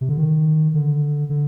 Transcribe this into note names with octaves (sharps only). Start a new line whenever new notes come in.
C3
D3
D#3
D3
D3